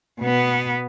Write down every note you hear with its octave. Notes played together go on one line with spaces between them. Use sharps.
B2 B3